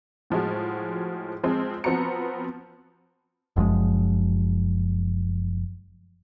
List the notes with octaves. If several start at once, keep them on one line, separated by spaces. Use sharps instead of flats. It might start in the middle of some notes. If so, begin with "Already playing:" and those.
A2 F3 G#3 F#4
F3 G#3 C4
F3 B3 C4 F#4 A#5 C#7
F#1 F#2 F3 G#3